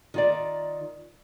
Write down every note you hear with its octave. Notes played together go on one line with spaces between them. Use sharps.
D#3 F4 D5